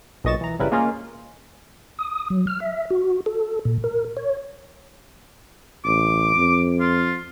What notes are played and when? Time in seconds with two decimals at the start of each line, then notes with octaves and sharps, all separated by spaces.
0.24 B1 A#2 D#5 C#6 A6 E7
0.41 E3 A#5
0.59 G1 C#3 G3 E4 A#4 B4
0.71 G#3 A#3 C#4 F4 G#4 A#4
1.99 D#6
2.30 F#3
2.47 F6
2.60 E5
2.90 F#4
3.26 A4
3.65 A#2
3.84 A#4
4.17 C#5
5.85 A1 D6
6.36 F2
6.80 F4